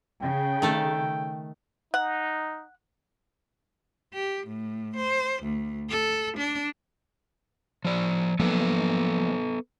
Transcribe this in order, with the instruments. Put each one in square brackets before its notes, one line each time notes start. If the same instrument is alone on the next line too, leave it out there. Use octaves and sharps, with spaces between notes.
[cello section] C#3 [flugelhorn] G5
[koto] D#3 A3 A4
[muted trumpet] D#4 [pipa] F#5
[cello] G4
A2
C5
D2
A4
D4
[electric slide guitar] F3 D5
[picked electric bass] F3 F#3 A#3 [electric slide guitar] B3 A4 B4